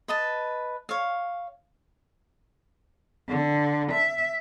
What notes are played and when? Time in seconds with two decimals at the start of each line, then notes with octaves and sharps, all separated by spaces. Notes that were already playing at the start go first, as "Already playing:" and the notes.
0.08 B4 D#5 A5
0.89 C#5 F5
3.29 D3
3.92 E5